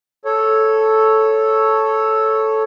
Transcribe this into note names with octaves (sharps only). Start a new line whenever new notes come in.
A4 C#5